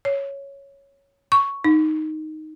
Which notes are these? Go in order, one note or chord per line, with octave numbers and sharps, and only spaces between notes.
C#5
C#6
D#4